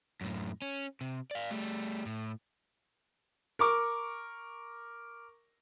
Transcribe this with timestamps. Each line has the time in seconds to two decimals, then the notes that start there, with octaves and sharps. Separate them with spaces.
0.21 F#2 A2
0.62 C#4
1.01 C3
1.31 D5 F5
1.51 G3 A3
2.06 A2
3.59 A#4 C#6 D6